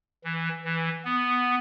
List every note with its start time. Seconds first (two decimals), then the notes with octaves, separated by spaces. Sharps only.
0.24 E3
0.64 E3
1.05 B3